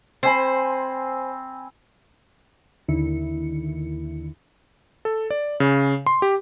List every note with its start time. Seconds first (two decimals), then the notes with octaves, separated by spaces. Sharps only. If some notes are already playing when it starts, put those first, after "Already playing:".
0.23 C4 C5 G#5 B5
2.88 D#2 D3 D#3 E4 C#7
5.05 A4
5.30 D5
5.60 C#3
6.06 C6
6.22 G4